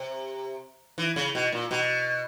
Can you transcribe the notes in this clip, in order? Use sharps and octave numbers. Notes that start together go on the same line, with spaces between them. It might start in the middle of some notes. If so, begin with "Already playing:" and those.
Already playing: C3
E3
C#3
B2
A#2
B2